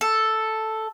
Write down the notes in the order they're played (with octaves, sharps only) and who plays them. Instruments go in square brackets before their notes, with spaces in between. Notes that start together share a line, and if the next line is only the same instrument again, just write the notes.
[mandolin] A4